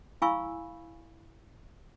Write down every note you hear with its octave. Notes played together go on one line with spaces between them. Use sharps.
E4 F5 G#5 B5 C#6 E6